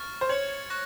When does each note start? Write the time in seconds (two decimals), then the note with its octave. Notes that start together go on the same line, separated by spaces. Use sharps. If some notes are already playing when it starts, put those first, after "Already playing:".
Already playing: C#6 F6 A6
0.21 C5
0.29 C#5 G#6 C#7 F#7
0.70 C#6 F#6 A#6